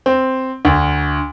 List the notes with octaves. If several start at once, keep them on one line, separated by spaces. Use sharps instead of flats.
C4
D2